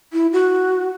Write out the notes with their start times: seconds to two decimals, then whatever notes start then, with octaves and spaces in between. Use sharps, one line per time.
0.13 E4
0.32 F#4